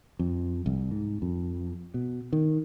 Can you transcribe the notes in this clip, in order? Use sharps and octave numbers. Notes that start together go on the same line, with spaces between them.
F2
C2
G#2
F2
B2
D#3